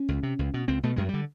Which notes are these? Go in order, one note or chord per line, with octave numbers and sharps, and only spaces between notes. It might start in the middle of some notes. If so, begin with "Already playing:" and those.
Already playing: C#4
C#2
C3
C#2
B2
C#2 C4
B2 A3
F#2 G#3
G3
D3